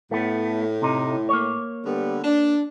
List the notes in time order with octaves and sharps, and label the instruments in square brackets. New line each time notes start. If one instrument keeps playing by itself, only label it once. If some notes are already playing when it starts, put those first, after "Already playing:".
[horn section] A2 [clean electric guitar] A3 B3
[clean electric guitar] C3 D#4
A#3 C#5
[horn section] D3 G3 B3
D4